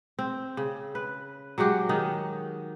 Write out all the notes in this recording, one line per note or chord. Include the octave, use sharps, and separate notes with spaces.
C4
C#3
B4
F#3 G#3 F#4 G4
D#3 D#4